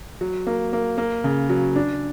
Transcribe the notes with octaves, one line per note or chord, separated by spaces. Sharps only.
F#3
A#3
A#3
A#3
C#3
F#3
D4